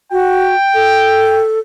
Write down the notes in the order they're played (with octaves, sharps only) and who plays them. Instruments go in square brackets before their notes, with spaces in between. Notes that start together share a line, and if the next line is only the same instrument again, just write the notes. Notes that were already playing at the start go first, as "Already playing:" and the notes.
[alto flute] F#4 [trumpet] G5
[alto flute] A4